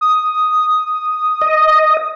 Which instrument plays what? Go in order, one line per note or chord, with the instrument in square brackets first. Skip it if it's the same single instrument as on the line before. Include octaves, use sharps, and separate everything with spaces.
[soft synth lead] D#6
[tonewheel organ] D#5